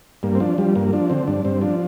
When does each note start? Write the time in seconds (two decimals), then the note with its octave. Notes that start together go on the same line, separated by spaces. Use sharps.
0.23 G2 A#3
0.35 C4
0.40 F3 D4
0.58 F3 G3
0.75 G2 A#3
0.93 F3 D4
1.10 D3 C4
1.27 G2 D4
1.45 G2 C4
1.62 F3 D4